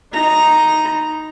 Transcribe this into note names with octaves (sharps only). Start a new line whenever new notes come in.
D#4 A#5